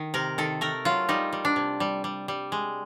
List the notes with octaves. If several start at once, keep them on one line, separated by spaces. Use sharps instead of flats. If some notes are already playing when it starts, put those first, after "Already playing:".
Already playing: D#3
C3 A#4
D#3 A4
A3 A#4
F#3 F4
G3 D#4
G3
D4
C3
G3
G3
G3
G#3